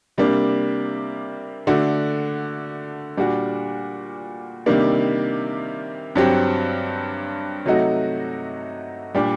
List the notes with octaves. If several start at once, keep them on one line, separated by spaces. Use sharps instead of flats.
C3 G3 A#3 D4
D3 A3 D4 F#4
A#2 G3 D4 F#4
C3 D#3 G3 A#3 D4
G2 F#3 C4 G4
C3 F#3 A3 D#4 F#4
A#2 G3 D4 G4